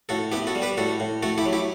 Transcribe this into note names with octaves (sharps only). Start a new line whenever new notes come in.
A2 F#4 A4
B3 E4 G4
F#4 A4
G3
G4 B4
A2 F#4 A4
A2
A3 F#4 A4
E4 G4
F#3
E4 G4